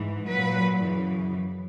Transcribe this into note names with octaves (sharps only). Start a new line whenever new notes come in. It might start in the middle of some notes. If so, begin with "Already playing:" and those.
Already playing: G#2 E3
A#2 F#3 B4
F#2 C#3 E3